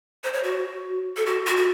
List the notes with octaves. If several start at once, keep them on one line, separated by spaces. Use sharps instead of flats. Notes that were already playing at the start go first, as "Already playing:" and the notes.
C5
C#5
F#4
A4
F#4
F#4
F#4